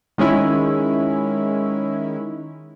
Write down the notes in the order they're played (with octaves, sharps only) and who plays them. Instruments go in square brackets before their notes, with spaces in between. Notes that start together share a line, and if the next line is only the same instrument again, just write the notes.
[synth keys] D#3 G#3 C#4 E4